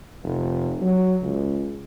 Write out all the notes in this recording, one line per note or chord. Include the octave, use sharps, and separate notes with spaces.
F1
F#3
C#2